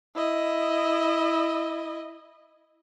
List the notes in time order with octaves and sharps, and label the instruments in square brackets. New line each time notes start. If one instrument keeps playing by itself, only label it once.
[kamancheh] E4 D#5